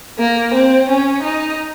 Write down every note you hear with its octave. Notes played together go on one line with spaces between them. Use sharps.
A#3
C4
C#4
D#4